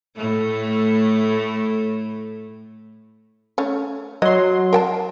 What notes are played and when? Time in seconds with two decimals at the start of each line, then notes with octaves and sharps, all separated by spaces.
0.16 A2 A3
3.58 A3 C#4
4.22 F#3 D#5 C6
4.73 A#4 G5 A5